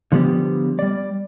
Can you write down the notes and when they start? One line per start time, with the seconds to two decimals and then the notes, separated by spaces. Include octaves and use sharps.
0.12 D3 F3 G3 A#3 B3 G4
0.79 G3 D5